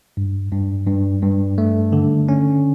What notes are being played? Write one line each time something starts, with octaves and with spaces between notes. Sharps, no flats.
G2
G2
G2
G2
A3
D3
C#4